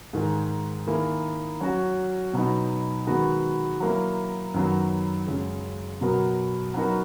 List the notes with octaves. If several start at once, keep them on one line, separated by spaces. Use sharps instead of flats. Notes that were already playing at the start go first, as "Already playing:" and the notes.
G#2 D#3 G#3
D#3 A#3 E4 G#4
F#3 C#4 F#4
B2 F#3 B3 D#4
D#3 G#3 B3 F#4
F#3 A#3 E4
F#2 D#3 F#3 B3
F#2 C#3 G#3
B2 F#3 B3 F#4 A#4
F#3 B3 D#4 F#4 A#4